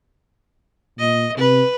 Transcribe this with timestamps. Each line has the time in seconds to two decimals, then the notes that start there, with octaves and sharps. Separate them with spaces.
0.99 A#2 D#5
1.38 C3 B4